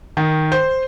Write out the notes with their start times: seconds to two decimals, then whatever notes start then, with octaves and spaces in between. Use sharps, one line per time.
0.17 D#3
0.52 C5